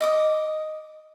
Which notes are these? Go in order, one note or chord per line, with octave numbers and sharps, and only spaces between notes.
D#5 D6 D#6